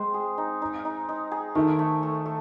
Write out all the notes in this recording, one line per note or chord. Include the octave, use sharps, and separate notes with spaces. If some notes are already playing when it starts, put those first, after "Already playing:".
Already playing: G#3 C4 C5
G#4
D#4
D#4
D#4
D#4
G#4
D#3 A3
A3
A3
A3